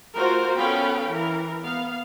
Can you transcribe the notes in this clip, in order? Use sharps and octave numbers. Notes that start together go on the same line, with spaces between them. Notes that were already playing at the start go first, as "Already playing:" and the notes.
A3 F4 F#4 A#4 C5
B3 C#4 A4 F5 G5 B5
E3 A#4
B3 F5